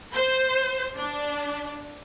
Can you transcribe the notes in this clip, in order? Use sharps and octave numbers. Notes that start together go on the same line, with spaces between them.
C5
D4